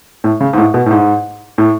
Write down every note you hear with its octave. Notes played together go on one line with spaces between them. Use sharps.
A2
C#3
G#2
A2
B2
A2
G#2
A2